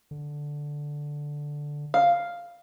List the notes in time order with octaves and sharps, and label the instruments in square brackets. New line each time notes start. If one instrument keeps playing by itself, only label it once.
[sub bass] D3
[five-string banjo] F5